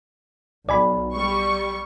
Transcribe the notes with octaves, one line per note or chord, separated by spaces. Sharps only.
B1 D5 G#5 B5
G3 C#6